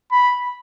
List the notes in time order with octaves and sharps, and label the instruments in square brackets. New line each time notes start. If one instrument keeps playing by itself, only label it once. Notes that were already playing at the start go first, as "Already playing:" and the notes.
[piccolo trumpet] B5